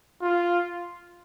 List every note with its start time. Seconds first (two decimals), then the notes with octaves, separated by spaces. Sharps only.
0.22 F4